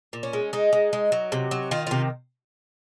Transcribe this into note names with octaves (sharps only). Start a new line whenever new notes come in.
A#2
C#4
G#3
G#3 D#4
G#3
G#3
F#3
C3
F#3
D#3 F4
C3 F4